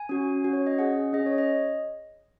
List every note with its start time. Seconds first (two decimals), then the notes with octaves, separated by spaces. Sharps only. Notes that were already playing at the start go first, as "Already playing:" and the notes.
Already playing: G#5
0.09 C#4 F#4
0.44 C#4 F#4
0.53 C#5
0.67 D#5
0.78 C#4 G#4 F#5
1.13 C#4 G#4 D#5
1.26 C#5
1.38 D#5